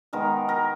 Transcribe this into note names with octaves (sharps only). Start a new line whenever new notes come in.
D#3 G#3 B3 A#4
A#4